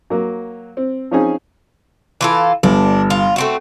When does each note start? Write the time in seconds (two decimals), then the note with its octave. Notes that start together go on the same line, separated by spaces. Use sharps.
0.10 F#3 A#3
0.77 C4
1.11 F3 C4 C#4 D#4 G#4 G#5
2.21 E3 F4 A4
2.63 G1 D4
3.10 F4
3.36 A3 C4 F#4